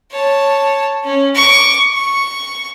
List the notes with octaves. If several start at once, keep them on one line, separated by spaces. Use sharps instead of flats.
C#5 A5
C#4
C#6 D6
C#6